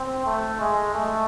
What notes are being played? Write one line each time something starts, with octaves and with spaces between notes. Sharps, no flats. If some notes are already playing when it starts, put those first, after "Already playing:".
Already playing: C4
A3
G#3
A3